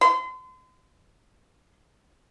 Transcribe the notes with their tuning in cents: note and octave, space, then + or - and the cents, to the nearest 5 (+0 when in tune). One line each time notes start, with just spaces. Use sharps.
C6 -35